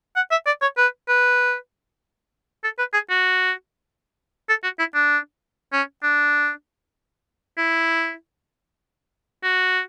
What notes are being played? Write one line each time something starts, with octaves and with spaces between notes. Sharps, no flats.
F#5
E5
D5
C#5
B4
B4
A4
B4
G#4
F#4
A4
F#4
E4
D4
C#4
D4
E4
F#4